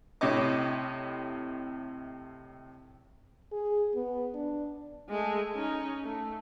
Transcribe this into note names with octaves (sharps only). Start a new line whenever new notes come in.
A2 C3 E4 C#5 D#5 D6
G#4
B3
D4
G#3 A3
C#4 D#4
A3